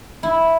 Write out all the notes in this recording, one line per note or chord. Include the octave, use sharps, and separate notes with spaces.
E4